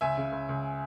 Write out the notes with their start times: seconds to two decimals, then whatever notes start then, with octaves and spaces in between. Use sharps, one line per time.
0.01 C#2 E5 G#5
0.17 C#3
0.32 C#2
0.49 C#2